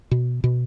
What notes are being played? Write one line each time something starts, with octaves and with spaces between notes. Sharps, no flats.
B2
B2